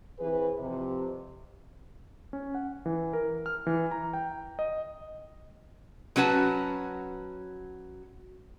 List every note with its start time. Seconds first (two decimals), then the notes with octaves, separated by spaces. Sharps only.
0.20 E3 C4 G#4 B4
0.59 F2 C3
2.33 C#4
2.55 F#5
2.86 E3
3.13 A#4
3.46 F6
3.67 E3
3.91 A#5
4.13 G5
4.59 D#5
6.16 F#3 C#4 F#4 B4 A5